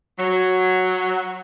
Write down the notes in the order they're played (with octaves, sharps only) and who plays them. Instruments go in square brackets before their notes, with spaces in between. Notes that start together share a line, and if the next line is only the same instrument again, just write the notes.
[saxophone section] F#3